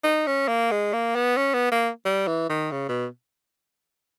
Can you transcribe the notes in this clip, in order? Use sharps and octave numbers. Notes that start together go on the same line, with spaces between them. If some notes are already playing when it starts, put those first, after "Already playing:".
D#4
C#4
A#3
G#3
A#3
B3
C#4
B3
A#3
G3
E3
D#3
C#3
B2